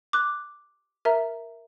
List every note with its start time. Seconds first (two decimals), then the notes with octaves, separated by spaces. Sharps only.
0.13 D6 F#6
1.05 A#4 E5 A#5